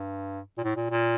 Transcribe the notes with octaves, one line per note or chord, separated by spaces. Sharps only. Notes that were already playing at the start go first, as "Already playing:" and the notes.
Already playing: G2
A#2
A2
A#2
A#2